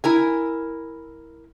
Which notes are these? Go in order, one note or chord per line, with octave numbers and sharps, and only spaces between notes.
E4 A#4 G#5